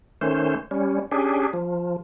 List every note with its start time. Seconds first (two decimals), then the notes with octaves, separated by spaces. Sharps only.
0.21 D#3 A3 C#4 C5
0.71 G3 C#4
1.11 C#4 D4 G4 G#4
1.53 F3